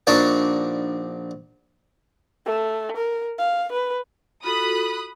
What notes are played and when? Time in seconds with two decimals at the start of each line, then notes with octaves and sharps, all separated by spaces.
0.07 A#1 D4 D#4 F#4 D5
2.46 A3
2.97 A#4
3.39 F5
3.72 B4
4.44 F4 F#4 A4 B5 D#6 F#6